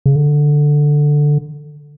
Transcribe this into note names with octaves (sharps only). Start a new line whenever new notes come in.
C#3
D3